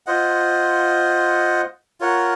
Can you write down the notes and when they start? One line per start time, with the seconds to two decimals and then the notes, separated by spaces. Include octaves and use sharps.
0.06 F4 C5 D#5 F#5
2.00 F4 A#4 C#5 F#5